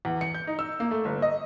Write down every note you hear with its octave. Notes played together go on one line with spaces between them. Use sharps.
E2
C#7
G6
D#4
E6
A#3
A3
G1
D#5